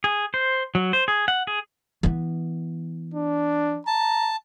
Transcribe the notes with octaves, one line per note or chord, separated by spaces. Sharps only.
G#4
C5
F#3
C5
G#4
F#5
G#4
E3 B3
D4
A5 A#5